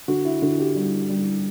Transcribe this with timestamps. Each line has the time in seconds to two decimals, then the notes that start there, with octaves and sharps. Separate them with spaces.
0.08 D3 F#4
0.25 E4
0.42 D3 F#4
0.59 G4
0.75 G3
1.09 G3